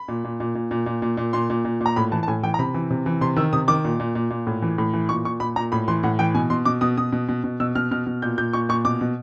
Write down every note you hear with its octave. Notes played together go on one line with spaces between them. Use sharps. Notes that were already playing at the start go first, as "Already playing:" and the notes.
Already playing: B5
A#2
A#2
A#2
A#2
A#2
A#2
A#2
A#2
A#2 C6
A#2
A#2
A#2
A#5
A2 B5
E3 A5
A5
A2 G#5
E3 G5
A#5
C3 B5
E3
C3
E3
C3 C6
D#3 E6
C3 D#6
D#3 D6
A#2
A#2
A#2
A#2
A2
E3
A2
E3
A#2 C#6
A#2 C#6
A#2 B5
A#2 A#5
A2 B5
E3 C6
A2 F#5
E3 G5
B2 G#5
B2 C6
B2 D6
B2 D#6
B2 D#6
B2
B2
B2
B2 E6
B2 F6
B2 F6
B2
A#2 G6
A#2 G6
A#2 C#6
A#2 C#6
B2 D6
B2